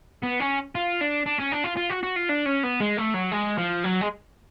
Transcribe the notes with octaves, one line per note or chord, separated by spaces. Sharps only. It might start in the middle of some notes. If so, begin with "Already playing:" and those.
B3
C#4
F4
D4
D4
C#4
D4
F4
F4
F#4
F#4
F4
D4
C#4
B3
G#3
A3
F#3
G#3
F3
F#3
G#3